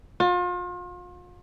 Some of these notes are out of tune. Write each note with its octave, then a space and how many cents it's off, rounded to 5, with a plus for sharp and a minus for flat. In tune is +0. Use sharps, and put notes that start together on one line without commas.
F4 +35